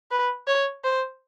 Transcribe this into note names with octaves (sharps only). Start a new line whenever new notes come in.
B4
C#5
C5